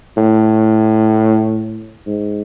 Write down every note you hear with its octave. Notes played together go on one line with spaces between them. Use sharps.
A2
G#2